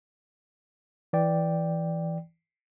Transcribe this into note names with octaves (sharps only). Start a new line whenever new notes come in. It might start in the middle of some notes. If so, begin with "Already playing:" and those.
E3 D5 G5